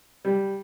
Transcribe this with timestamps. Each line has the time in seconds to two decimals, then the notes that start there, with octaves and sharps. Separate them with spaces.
0.25 G3